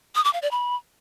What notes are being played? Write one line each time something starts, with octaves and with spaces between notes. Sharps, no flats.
D#6
D6
F5
D5
B5